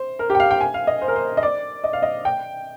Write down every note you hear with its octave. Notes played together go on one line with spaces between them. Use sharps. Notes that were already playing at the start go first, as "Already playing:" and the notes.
Already playing: C5
A#4
G4
G5
F5
G5
G#5
F5
D#5
C5
A#4
C5
D#5
D5
D#5
F5
D#5
G5